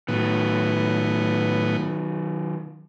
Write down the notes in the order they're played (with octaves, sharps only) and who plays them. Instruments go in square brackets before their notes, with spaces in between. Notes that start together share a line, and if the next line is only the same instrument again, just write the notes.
[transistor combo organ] A2 B3 [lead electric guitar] D#3 F#3